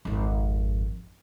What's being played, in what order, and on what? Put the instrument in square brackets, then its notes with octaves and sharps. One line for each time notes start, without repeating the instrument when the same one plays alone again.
[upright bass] G#1 F2